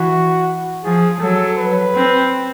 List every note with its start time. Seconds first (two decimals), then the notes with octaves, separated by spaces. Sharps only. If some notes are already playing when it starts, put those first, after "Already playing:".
Already playing: E3 F#4
0.84 F3 G#4
1.21 F#3 A4
1.57 B4
1.94 C4